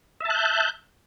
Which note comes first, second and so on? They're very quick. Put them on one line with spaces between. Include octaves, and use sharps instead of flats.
E5 A5 F#6 G6